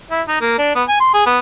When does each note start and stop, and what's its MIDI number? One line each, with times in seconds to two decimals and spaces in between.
0.11 0.22 64
0.28 0.41 63
0.41 0.55 58
0.59 0.71 62
0.76 0.83 59
0.89 0.99 80
1.00 1.13 84
1.14 1.25 68
1.26 1.39 59